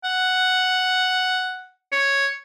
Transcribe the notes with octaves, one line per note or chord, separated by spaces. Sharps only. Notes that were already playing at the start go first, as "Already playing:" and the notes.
F#5
C#5